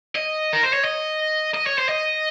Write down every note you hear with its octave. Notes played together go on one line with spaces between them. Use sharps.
D#5
A#4
C5
C#5
D#5
D#5
C#5
C5
D#5